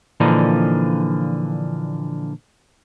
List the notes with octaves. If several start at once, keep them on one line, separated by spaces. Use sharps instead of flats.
A#2 D3 E3 F3 D4 D#4